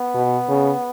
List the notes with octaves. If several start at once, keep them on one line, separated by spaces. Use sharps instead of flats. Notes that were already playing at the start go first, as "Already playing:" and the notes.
Already playing: B3
B2
C#3